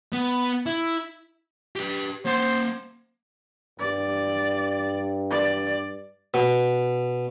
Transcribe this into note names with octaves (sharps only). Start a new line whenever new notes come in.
B3
E4
G4 B4
A#3 C5 F#5
G2 D5
D5
B2